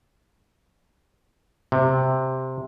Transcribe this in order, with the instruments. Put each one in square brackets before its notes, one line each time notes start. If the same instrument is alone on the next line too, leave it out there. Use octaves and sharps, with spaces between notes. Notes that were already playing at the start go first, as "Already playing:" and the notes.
[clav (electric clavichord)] C3